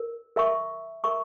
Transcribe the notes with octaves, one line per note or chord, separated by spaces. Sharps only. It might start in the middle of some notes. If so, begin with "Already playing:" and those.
Already playing: A#4
A#4 E5 A#5 C#6
A#4 E5 A#5 C#6